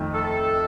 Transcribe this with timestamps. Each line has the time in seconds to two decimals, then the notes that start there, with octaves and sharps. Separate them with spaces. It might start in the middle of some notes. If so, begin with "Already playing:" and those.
Already playing: F2 D#3 A3
0.14 A4